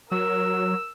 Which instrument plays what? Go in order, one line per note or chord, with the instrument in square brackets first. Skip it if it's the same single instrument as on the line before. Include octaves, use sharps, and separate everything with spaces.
[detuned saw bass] F#3 [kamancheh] A#4 [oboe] E6